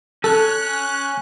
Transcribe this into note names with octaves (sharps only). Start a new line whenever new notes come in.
C#4 A4 F#6